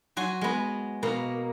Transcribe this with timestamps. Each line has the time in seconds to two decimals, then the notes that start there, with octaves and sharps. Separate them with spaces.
0.16 F#3 F#4 G#5 C6
0.41 G#3 B3
1.03 B2 A#3